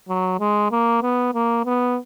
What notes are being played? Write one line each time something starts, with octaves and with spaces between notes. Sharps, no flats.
F#3
G#3
A#3
B3
A#3
B3